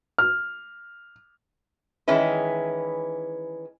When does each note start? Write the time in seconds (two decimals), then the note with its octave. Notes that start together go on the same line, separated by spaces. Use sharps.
0.18 F6
2.08 D#3 E3 G#3 C#4 E4 B4